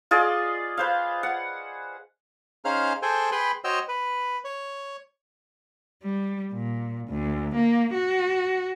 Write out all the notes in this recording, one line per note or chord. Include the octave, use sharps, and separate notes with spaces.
F4 G#4 D5 D#5
B4 C5 F5
F#5
C#4 D#4 G#4 C5 F5 F6
G#4 A4 C5 G5 G#5
G#4 B4 G5 B5 C6
F#4 C5 C#5 D#5 G5 E6
B4
C#5
G3
A#2
D2
A#3
F#4